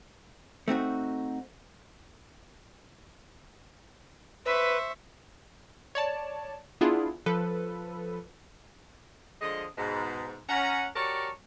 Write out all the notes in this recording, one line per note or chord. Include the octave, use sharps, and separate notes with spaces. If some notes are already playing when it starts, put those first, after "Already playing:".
A3 C4 D#4 F#4
B4 C5 E5 C#6
C#5 D5 A5
B3 D4 E4 F4 G#4
F3 A4 B4
D3 F3 G#3 D#5
G#2 B2
C#4 F#5 A#5
F#4 G4 A#4 C#5 D5 A5